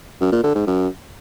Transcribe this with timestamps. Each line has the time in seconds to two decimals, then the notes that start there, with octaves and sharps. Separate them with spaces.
0.21 F#2
0.32 A#2
0.44 D3
0.55 G#2
0.67 F#2